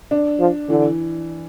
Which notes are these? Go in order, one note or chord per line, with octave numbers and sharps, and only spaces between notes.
D4
F3
D3 E3